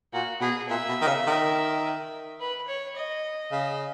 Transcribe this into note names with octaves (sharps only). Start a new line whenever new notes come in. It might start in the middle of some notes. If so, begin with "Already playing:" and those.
A#2 F#4
B2 G#4
A#2 E5
B2
D#3
C#3
D#3
B4
C#5
D#5
C#3